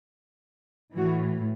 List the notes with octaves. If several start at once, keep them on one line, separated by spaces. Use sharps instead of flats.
A2 E3 F#4